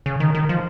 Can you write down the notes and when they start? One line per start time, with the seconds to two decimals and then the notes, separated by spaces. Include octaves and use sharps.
0.06 C#3
0.20 D#3
0.35 D#3
0.49 F3